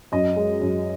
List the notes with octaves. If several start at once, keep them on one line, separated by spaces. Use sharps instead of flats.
F#2 D#5
G#3
F#2